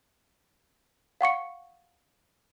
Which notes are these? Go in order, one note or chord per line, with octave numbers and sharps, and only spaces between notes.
F5 F#5 C#6 C#7